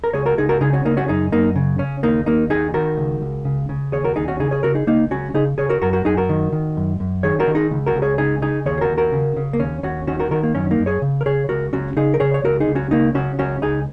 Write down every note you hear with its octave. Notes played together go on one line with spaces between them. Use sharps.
A#4
C#2 G#4 C#5
F#4 A#4
C#2 D#4 G#4
F#4 A#4
C#3 D#4 G#4
C#4 F#4
C#3 A#3 D#4
C#4 F#4
F#2 D#4 G#4
F#2 A#3 D#4
C#3
C#3 C#4
D#2 A#3 D#4
D#2 A#3 D#4
D#3 D#4 G#4
D#3 F#4 A#4
C#2
C#2
C#3
C#3
D#2 G#4 C#5
F#4 A#4
D#2 D#4 G#4
C#4 F#4
C#3 D#4 G#4
G#4 C#5
C#3 F#4 A#4
D#4 G#4
C#2 A#3 D#4
C#2 C#4 F#4
C#3 D#4 G#4
C#3 G#4 C#5
F#4 A#4
F#2 F#4 A#4
F#4 A#4
F#2 D#4 G#4
F#4 A#4
D#3
D#3
F#2
F#2
D#3 G#4 C#5
F#4 A#4
D#3
D#4 G#4
C#2
F#4 A#4
C#2
G#4 C#5
C#3 D#4 G#4
C#3 D#4 G#4
D#2 G#4 C#5
G#4
F#4 A#4
D#2
F#4 A#4
C#3
C#3
A#3
D#2 C#4
D#2 C#4 F#4
D#3 C#4 F#4
F#4 A#4
D#3 F#4 A#4
A#3
F#2 C#4
A#3 D#4
F#2
G#4 C#5
C#3
A#4
C#3 G#4 C#5
C#2 F#4 A#4
C#2 C#4 F#4
C#3 D#4 G#4
A#4
C#3 G#4 C#5
C#5
C#2 F#4 A#4
D#4 G#4
C#2
C#4 F#4
C#3 A#3 D#4
C#3 C#4 F#4
C#2 C#4 F#4
C#2 D#4 G#4